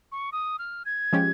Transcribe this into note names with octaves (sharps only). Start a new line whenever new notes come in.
C#6
D#6
F6
G#6
F3 G#3 C#4 G4